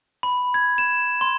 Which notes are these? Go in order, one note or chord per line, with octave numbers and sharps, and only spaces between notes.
B5
G#6
E7
C6